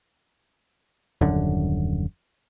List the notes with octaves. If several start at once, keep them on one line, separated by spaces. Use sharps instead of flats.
D#1 F#2 D3